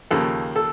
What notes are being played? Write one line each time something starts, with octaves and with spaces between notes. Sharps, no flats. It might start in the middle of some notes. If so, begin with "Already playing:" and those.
D#2 C#3 F3 A#3 A4
A4